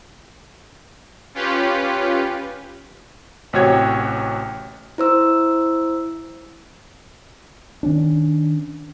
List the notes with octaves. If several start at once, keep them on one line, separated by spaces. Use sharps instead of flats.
C#4 F4 G4 B4
A1 C3 F#4 C#5 G5 G#6
E4 C5 E6
D#3 C#4 D4